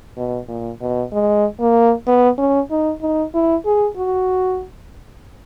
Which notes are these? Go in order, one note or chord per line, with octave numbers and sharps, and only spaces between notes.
B2
A#2
B2
G#3
A#3
B3
C#4
D#4
D#4
E4
G#4
F#4